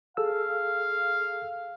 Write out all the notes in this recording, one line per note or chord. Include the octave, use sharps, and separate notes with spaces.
G#4 A4 F5 E6